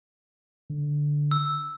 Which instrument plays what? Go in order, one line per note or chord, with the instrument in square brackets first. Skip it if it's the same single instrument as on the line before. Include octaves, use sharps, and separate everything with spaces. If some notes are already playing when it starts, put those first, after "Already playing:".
[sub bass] D3
[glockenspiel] E6